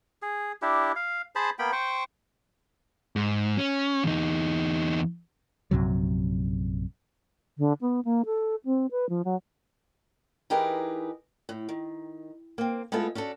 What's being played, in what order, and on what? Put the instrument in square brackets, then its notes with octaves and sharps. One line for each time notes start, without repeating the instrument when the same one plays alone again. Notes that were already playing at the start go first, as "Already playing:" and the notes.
[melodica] G#4
D4 E4 G4
F5
G#4 C5 A5 B5
A#3 B3 G5 B5
C5 G5 C#6
[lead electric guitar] G#2
C#4
E2 D#4
[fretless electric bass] A#1 F#2 C3 F#3
[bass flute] D3
B3
A#3
A4
C4
B4
F3
F#3
[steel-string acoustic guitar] E3 D#4 G4 G#4 A#4 B4
A2
D#3
A#3 C4
G#3 A3 B3 E4 F4 A4
C#4 D4 F#4 A4